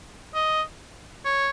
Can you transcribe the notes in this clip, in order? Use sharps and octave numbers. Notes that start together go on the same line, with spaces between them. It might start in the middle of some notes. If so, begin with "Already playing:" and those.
D#5
C#5